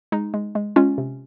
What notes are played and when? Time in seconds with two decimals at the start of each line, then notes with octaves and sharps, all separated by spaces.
0.12 G#3 D#4
0.34 G#3
0.55 G#3
0.76 G#3 C#4 F4
0.98 C3